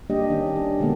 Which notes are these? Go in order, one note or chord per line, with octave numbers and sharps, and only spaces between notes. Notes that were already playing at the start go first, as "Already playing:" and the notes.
G3 A#3 D4 G4 D#5
D#3 C#4
D4
B2 D3 D#3 G#3 A#3 B3